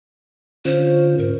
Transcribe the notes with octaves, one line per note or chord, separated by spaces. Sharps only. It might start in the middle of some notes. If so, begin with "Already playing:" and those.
D3 C#4 F4 C5
G#2 A#4